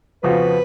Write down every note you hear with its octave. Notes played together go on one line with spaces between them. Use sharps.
F2 C#3 F3 B3 F#4 B4